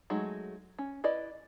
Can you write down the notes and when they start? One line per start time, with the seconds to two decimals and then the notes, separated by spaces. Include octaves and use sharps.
0.10 F#3 G#3 A3 D#4
0.79 C#4
1.04 E4 B4 D5 D#5